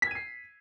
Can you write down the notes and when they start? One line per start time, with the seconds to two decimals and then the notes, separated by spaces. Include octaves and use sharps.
0.02 B6
0.07 G#6
0.11 D#7
0.15 C7